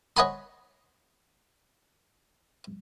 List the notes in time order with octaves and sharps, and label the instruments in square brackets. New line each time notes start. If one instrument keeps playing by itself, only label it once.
[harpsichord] C#5 D#5 F#5 G#5 B5 C6